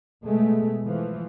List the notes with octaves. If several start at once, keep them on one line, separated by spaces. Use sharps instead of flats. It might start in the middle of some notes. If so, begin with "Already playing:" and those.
B2 G#3 A3
E3 F3